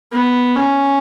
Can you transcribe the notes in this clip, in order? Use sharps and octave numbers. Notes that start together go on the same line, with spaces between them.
B3
C#4